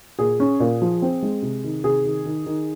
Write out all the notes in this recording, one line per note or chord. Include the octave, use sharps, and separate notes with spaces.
A#2 G#4
C#4
A#2
F3
C4
G#3
C3
D#3
C3 G#4
D#3
D#3
D#3